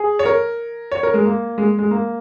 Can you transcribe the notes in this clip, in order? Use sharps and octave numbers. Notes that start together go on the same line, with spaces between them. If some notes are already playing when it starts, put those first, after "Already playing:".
Already playing: G#4
C#5
A#4
C#5
A#4
G#3
A#3
G#3
G#3
A#3